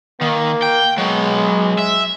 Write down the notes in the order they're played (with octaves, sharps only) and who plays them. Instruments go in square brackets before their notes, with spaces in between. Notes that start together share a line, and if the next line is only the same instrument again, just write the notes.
[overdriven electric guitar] D#3 [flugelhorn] A#3
[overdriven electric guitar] G5
[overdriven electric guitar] F#3 B3 [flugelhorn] G#3
[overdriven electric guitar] E5